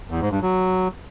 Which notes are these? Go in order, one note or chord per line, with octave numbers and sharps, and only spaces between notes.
E2
G#2
G2
F#3